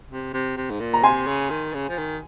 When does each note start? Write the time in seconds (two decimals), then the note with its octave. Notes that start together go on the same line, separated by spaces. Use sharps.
0.11 C3
0.33 C3
0.57 C3
0.71 G#2
0.80 A#2
0.94 A#5
1.03 C3 G#5 C6
1.27 C#3
1.50 D#3
1.74 C#3
1.89 F3
1.98 D#3